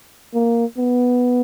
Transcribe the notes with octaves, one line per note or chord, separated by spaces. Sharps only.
A#3
B3